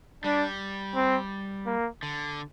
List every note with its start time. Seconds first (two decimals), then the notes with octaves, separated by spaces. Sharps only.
0.24 G3 D4
0.95 C4
1.66 A#3
2.03 D3